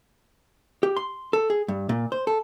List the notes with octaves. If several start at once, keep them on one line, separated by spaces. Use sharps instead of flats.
G4
C6
A4
G#4
G2
A#2
C5
A4